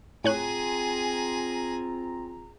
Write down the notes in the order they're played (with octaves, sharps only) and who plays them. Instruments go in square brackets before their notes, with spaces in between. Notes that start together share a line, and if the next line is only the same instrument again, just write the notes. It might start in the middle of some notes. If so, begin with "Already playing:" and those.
[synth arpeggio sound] A2 C#5 F#6 [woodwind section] C4 F4 A#5 [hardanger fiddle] G#4 G#5